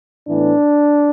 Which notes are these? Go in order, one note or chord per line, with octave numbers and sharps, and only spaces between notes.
A2 E3 B3 D4